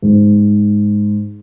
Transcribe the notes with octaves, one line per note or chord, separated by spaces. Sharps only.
G#2